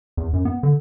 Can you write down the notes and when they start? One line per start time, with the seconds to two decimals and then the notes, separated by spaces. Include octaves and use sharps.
0.17 E2
0.33 F#2
0.45 B3
0.63 D3